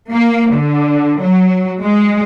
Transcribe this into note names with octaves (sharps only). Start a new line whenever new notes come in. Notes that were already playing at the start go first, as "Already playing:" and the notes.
A#3
D3
F#3
G#3